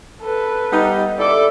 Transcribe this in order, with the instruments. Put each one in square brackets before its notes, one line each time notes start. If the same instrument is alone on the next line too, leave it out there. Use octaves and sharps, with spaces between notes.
[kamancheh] A4 B4
[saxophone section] G3 B3 D#4
[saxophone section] E4 A4 [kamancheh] D5 D6